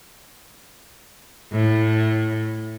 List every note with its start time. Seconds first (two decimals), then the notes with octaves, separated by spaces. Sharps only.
1.52 A2